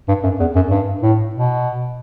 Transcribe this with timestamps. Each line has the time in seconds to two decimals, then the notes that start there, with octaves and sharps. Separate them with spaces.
0.08 G2
0.23 F#2
0.40 E2
0.55 F#2
0.70 G2
1.02 A2
1.34 B2